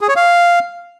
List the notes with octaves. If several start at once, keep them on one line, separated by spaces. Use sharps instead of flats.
G#4
C#5
F5